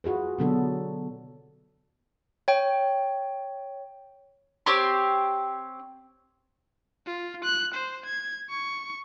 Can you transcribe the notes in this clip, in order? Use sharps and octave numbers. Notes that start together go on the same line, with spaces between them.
F4 F#4 G#4 B4
B2 D3 F#3 B3 D4 A4
C#5 G5
C4 G4 C#5 C6
F4
F#6
C5
G#6
C#6